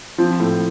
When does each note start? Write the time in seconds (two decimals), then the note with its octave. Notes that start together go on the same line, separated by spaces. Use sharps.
0.18 F3 C4
0.40 A2